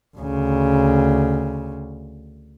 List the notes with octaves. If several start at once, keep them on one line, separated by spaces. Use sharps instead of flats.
D2 C#3